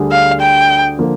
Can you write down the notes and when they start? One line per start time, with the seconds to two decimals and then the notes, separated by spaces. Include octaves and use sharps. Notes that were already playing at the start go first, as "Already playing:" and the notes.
Already playing: D2 D3 G3 D4 G#4
0.11 F5
0.41 G5
0.98 D3 F3 A#3